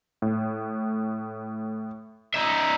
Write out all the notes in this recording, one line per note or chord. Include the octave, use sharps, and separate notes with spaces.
A2
D#4 E5